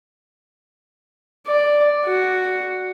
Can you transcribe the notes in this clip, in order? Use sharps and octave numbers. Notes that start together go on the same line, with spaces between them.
D5
F#4